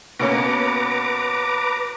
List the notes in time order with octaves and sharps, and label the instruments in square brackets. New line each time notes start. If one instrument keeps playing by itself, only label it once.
[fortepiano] B2 A#3 C#4 [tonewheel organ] B4 A#5 D6